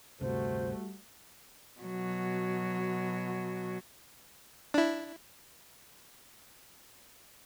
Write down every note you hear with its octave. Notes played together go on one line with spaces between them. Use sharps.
D1 G2 C3 G3 A3 F#4 C5
B2 F#3
D4 E4